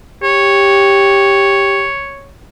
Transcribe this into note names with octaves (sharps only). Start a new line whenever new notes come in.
G4 C#5